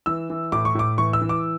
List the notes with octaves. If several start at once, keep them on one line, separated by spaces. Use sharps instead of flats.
E3 E6
E3
A2 D6
C#6
A2 D6
E3 C#6
E6
E3
D6